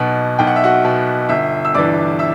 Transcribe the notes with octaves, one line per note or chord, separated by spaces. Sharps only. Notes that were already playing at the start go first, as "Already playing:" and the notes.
Already playing: B1 B2 F#4
B1 G5
F#5
E5
F#4 F#5
B2
G1 E5
E6
G2 E3 D5 D6
E5 E6